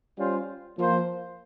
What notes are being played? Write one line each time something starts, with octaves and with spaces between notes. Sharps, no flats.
G3 C#4 F4 C5
F3 A#3 F4 C5